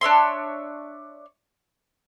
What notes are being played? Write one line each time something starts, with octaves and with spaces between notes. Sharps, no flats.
D4 C#5 E5 C6